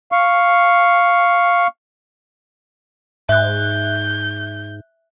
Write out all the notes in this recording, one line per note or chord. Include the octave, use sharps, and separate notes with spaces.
F5 C#6
G#2 E5 F#6 G6